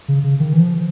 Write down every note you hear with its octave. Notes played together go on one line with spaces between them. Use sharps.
C#3
C#3
D#3
E3
F3